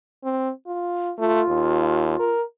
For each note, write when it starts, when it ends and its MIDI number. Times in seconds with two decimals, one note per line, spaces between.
0.24 0.50 60
0.67 1.12 65
1.18 1.41 57
1.18 2.30 65
1.48 2.18 39
2.19 2.42 70